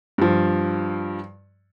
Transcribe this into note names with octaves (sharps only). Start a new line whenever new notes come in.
G2 F3